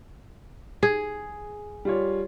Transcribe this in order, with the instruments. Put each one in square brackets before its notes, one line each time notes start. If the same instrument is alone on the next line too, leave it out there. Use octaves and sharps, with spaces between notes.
[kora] G#4
[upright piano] G3 F4 C#5